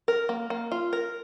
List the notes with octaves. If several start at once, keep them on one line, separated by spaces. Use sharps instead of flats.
A#4
A#3
A#3
F4
A#4